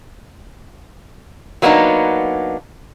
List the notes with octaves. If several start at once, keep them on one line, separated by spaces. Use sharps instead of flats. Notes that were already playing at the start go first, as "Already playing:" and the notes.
F#3 A#3 B3 D4 D#4